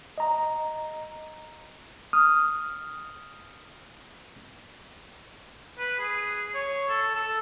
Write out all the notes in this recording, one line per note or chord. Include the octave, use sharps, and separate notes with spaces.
D#5 A#5
D#6 F6
B4
G#4
C#5
A4
A4